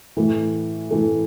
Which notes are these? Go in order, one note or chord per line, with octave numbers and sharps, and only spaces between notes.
A2 E3 A3
A2 E3 A3